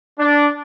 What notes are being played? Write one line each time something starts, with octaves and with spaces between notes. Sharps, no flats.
D4